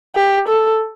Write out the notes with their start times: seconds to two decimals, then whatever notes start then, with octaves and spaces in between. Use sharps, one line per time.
0.15 G4
0.48 A4